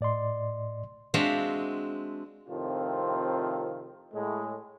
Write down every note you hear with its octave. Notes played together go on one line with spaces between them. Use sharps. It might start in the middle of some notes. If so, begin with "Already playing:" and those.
A2 D5 D#5 C6
G#3 C4 D4 F#4 E5 F5
A2 C3 D#3 F3 C4 F4
A2 G#3